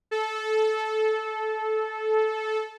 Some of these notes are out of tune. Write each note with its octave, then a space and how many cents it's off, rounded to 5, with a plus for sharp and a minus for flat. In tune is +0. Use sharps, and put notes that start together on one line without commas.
A4 -15